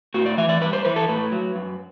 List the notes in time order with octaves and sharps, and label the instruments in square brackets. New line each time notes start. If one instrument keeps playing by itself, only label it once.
[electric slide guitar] A2 F#4
D5
E3 E5
D5
G2 B4
C5
E3 B4
A4
A2 B4
F#3
F#2